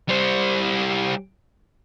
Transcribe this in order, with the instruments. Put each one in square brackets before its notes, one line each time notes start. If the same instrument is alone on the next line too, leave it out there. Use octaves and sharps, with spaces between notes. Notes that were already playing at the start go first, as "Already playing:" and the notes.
[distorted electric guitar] G3 C5